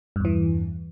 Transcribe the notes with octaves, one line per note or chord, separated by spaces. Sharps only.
E2 G2 E3